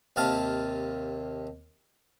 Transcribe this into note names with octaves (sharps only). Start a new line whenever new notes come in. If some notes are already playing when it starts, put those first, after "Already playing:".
D#2 C3 F5 A5